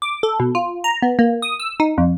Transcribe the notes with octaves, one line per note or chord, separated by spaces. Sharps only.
D6
A4
B2
F4
A#5
B3
A#3
D#6
E6
D#4
F2